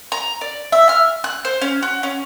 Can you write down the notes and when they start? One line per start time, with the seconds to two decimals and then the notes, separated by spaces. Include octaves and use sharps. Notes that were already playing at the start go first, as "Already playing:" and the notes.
0.12 A#5
0.41 D5
0.72 E5
0.89 F6
1.24 F#6
1.45 C5
1.62 C#4
1.82 F#4
2.03 C#4